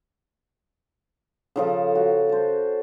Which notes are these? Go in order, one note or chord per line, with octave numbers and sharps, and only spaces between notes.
C#3 F3 A4
F#4
C5 A5